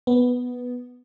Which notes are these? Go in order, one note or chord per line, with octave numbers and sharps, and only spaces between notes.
B3